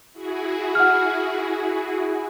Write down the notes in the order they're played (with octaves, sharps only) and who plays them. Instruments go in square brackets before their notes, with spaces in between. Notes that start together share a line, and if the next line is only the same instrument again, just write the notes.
[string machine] E4 F#4 G#4
[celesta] F#5 F6